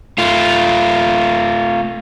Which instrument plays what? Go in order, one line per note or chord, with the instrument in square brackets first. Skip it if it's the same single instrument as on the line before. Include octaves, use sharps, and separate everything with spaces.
[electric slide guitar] A3 F4